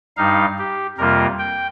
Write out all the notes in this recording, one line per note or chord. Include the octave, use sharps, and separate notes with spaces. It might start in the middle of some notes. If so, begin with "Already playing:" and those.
G2 G3 D#4 F5
G4
F2 C3 G3 A#3 F4 A#4
G5